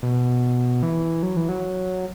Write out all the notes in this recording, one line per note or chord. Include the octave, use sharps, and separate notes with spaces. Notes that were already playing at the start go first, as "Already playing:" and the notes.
B2
E3
F#3
E3
F#3